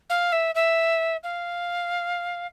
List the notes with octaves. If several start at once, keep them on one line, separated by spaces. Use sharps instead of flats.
F5
E5
E5
F5